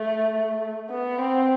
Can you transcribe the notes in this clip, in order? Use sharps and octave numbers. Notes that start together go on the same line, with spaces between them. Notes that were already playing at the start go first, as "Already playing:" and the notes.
Already playing: A3
B3
C4